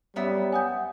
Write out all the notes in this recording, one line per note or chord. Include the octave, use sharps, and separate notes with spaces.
F#2 G3 B3 C#5 E5
F#5 G#5 D#6 G6